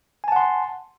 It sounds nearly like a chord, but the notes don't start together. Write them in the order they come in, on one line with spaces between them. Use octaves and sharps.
G#5 A5 F#5 C6